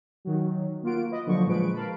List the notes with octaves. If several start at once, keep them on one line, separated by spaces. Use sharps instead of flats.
D#3 F#3
A#3 F4 F#4 D7
B4 D#5
D3 F3 F#3 C#6
A#2 F3 G#3 B4 D7
A#4 F5 A5 B5